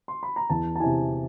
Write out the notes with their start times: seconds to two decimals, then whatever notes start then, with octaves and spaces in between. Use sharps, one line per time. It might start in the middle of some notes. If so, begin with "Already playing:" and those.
0.08 C6
0.23 B5
0.36 A#5
0.50 E2 A5
0.76 A5
0.80 C3 E3 G#5